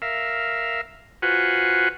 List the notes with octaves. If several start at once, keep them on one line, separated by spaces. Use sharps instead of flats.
A#4 E5 F5
F4 F#4 B4 C5 F#5 G#5